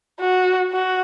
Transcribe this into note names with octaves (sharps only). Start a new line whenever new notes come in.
F#4
F#4